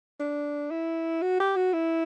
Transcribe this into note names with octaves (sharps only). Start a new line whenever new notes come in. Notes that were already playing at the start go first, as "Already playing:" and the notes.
D4
E4
F#4
G4
F#4
E4